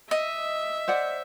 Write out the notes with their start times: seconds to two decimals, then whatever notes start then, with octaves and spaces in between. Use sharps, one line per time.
0.11 D#5 E5
0.88 C5 D5 F#5